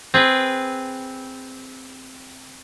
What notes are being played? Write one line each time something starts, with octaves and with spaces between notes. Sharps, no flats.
C4 G#4 B4